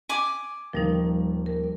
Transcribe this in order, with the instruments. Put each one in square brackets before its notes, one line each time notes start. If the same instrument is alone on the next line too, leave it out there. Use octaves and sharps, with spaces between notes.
[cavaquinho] G#5 D6
[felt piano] D#1 D#3 A#3 [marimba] F3 G3 D#4
[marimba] A#4